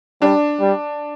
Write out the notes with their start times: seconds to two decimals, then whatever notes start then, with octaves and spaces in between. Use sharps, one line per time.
0.22 G3 D4
0.60 G3